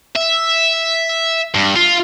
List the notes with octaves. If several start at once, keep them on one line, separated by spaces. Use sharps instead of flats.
E5
G2
F4